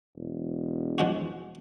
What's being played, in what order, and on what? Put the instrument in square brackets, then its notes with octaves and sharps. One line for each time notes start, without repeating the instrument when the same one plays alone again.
[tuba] E1
[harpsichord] F3 G#3 F#4